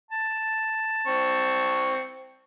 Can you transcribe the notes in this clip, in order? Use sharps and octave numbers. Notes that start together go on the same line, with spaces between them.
A5
C4 C#6